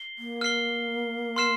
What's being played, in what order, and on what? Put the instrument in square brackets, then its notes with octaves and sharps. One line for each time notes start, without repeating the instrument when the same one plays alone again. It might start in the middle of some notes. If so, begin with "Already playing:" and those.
Already playing: [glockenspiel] C7 G7
[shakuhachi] A#3
[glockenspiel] F6 C7 G7
C6 F6 C7 E7